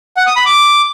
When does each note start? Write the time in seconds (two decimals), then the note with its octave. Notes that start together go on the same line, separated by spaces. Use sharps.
0.17 F#5
0.27 D#6
0.36 B5
0.46 D6